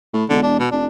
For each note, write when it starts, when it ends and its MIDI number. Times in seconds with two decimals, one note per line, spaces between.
0.13 0.24 45
0.29 0.60 28
0.29 0.40 50
0.43 0.57 62
0.59 0.67 47
0.71 0.87 29
0.71 0.87 62